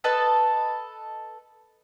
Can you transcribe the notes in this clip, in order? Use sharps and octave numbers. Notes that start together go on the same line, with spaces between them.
A4 B4 D#5 A5